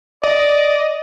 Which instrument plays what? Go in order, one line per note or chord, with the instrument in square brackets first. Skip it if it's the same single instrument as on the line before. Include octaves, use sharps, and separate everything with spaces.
[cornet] D5 [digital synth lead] D#5